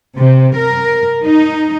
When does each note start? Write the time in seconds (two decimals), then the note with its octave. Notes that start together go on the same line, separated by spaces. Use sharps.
0.17 C3
0.56 A#4
1.24 D#4